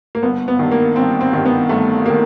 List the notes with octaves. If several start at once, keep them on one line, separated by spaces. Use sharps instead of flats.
A#3
G1 B3
B3
G2 D#3
A#3
G1 C4
C4
G2 D#3
B3
G1 A3
D#3 A#3